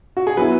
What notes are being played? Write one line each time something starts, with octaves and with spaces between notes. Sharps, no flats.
F#4
G#4
F#3 B3 E4 B4